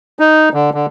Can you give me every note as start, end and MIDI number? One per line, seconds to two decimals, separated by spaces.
0.19 0.49 63
0.54 0.70 50
0.74 0.86 50